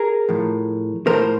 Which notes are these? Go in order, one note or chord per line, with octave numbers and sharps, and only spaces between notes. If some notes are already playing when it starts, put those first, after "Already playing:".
Already playing: G#4 A#4
A2 F3
A2 F3 A#4 C5